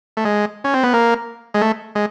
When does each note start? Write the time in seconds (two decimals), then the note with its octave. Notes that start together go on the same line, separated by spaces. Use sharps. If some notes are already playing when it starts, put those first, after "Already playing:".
0.17 A3
0.25 G#3
0.64 C#4
0.74 C4
0.84 B3
0.94 A#3
1.54 G#3
1.61 A3
1.95 G#3